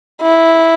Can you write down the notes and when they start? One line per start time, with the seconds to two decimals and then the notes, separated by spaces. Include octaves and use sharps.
0.22 E4